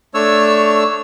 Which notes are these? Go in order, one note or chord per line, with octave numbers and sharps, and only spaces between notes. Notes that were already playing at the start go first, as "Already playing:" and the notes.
A3 D4 C#5 E6